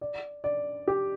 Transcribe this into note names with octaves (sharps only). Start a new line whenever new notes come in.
D5
D5
G4